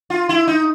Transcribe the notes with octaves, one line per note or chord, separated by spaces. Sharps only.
F4
E4
D#4